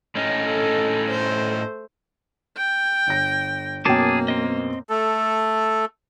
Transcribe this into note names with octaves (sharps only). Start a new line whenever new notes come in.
A2 C#4 D#4
A4
A3 C5
G5
G1 A#6
F#2 B2 A#3 G#4 G5 A5 D6
C4 D#5
A3 A4